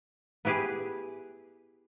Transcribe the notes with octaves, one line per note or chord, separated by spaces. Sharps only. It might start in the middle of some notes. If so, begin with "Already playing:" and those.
B3 E4 G4 G#4 B4